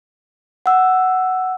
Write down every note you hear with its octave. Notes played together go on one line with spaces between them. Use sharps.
F#5 E6